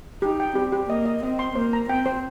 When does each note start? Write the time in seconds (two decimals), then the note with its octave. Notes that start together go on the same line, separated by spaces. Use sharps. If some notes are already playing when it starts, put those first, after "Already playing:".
0.22 D#4 G4
0.40 G5
0.55 C4 G4
0.72 G4
0.89 A#3 D#5
1.06 D#5
1.23 C4 D#5
1.39 C6
1.55 A#3 C5
1.73 A#5
1.89 C4 G5
2.06 C5